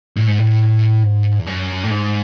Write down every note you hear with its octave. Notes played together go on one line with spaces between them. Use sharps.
A2
G#2
A2
G#2
E2
F#2
A2
G#2